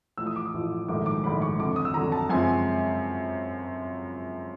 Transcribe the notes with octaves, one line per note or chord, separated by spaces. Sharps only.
A1 A2 F3 E6
D#6
D6
D#6
A1 A2 F3
A#1 G#2 D#3 F#3 A3 D6
D6
A#1 G#2 D#3 F#3 A3 B5
C#6
F2 D3 F#3 D6
D#6
E6
F2 D3 F#3 A#5
A5
F#2 C#3 F3 G#3 C4 G#5